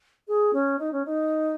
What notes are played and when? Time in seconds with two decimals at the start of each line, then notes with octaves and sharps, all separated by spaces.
0.28 G#4
0.53 C#4
0.79 D#4
0.92 C#4
1.05 D#4